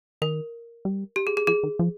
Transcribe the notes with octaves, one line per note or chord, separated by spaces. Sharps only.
D#3 A#4
G3
G4
G#4
G#4
F3 G#4
D#3
F3